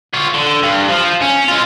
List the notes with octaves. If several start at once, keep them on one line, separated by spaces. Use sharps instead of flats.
F4 C#5
D3
G2
F3
C#4
G#3 F4